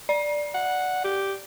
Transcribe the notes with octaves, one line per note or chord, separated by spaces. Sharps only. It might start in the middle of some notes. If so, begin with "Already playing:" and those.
D5
F#5
G4